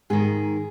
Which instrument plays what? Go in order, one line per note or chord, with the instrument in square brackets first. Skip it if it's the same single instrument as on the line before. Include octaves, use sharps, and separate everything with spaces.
[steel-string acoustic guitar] G#2 D#3 G#4